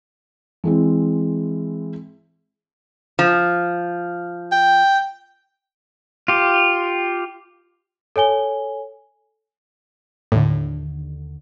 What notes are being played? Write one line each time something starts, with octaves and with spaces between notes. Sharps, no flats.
E3 G#3 C4
F3
G5
F4 G4
A4 C#5 G#5 G7
D#2 A2 D3